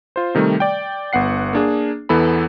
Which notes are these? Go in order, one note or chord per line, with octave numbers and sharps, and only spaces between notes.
F4 C5
C3 D#3 G3 A3
D5 G5
G1 B3 F#5 C7
A#3 D4 G#4
E2 E3 B3 A4 B5